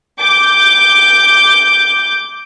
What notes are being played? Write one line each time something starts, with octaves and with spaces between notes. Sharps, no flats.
D6 G6